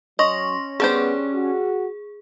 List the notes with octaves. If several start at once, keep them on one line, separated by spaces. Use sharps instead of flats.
F#3 C#4 D#5 C6 C#6 A#6
G3 B3 D4 G#4 C5
F#4